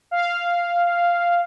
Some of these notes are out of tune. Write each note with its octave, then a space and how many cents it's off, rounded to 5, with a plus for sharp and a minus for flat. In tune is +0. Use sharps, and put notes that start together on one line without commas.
F5 -5